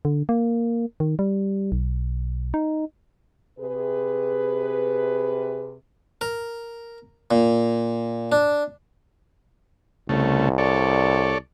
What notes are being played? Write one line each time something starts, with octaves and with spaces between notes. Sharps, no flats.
D3
A#3
D#3
G3
B1
D#4
C3 G#4 B4
A#4
A#2
D4
C2 C#3 A3
A4 C#5 D5